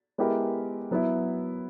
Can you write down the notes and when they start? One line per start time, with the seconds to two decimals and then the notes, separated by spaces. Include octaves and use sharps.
0.18 G#3 B3 E4 G4 A#4
0.91 F#3 B3 E4